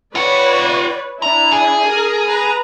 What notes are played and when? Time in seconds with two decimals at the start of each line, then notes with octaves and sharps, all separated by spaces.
0.15 F4 B4 C#5 D5 F#5
1.22 D4 E4 A#5
1.52 G#4
1.88 A#4
2.27 B4 A#5